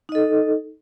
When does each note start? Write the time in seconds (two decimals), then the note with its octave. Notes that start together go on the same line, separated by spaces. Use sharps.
0.09 D#4
0.12 D#5
0.15 A4